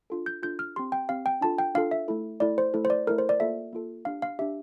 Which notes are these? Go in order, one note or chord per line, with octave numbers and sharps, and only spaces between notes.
D4 F4 A4
G6
D4 F4 A4 G6
F6
C4 G4 C6
G5
C4 G4 F5
G5
D4 F4 A4 A5
G5
D4 F4 A4 F5
E5
A3 E4 A4
A3 E4 A4 D5
C5
A3 E4 A4
C5
D5
A3 E4 A4 A#4
C5
D5
A#3 F4 A4 E5
A#3 F4 A4
D4 G4 F5
F5
D4 G4 E5